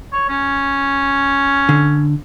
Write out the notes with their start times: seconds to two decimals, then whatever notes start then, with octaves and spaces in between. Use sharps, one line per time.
0.12 C#5
0.29 C#4
1.69 D3